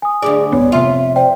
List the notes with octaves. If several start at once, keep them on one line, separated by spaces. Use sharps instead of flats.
G#5 D#6
D2 G#2 G#4 D5
D#1 G#1 B3 C#5
F1 C3 F4 E5
C5 D5 G5